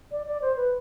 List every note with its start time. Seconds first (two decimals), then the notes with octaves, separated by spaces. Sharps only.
0.11 D5
0.26 D5
0.42 C5
0.56 B4